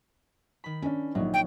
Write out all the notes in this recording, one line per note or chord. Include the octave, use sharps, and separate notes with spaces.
D#3 B5
C#4 D4
A#1 D#3 F#3
G5